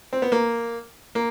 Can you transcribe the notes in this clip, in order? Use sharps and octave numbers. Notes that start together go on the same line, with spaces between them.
C4
B3
A#3
A#3